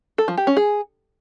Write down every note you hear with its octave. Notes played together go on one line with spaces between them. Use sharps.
A4
F3
G4
C#4
G#4